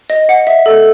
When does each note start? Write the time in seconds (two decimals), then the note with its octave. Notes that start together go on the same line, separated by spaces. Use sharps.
0.10 D#5
0.29 F#5
0.47 E5
0.66 A4